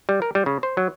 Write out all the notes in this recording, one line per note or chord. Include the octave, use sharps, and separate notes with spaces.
G3
A#4
G3
C#3
C5
F#3